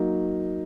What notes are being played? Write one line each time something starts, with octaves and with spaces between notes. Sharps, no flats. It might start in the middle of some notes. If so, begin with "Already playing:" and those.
Already playing: F#3 A#3 D#4